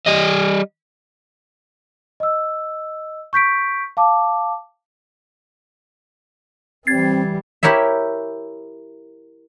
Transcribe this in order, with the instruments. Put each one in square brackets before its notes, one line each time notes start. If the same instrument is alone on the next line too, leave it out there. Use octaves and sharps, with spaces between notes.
[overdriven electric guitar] G3 D#5
[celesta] D#5 E6
C#6 G6 B6 D7
F5 A5 D6
[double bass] E3 G3 [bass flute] C4 [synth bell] G#6 A6 C7
[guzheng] E4 G4 A#4 C#5 E5